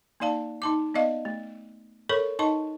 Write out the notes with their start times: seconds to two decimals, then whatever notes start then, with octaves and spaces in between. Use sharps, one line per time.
0.20 A#3 D#4 D5 F5 A5
0.62 D#4 A5 D6
0.94 B3 D5 D#5 F5
1.25 A3
2.09 A4 A#4 C#5 B5 C#6
2.39 D#4 D#5 A5 C#6